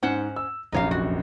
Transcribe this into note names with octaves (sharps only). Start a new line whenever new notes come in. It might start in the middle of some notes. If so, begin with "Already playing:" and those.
G#2 C#4 C5 F#5
E6
F1 A#1 F#2 D#4 C#5 F5
F#4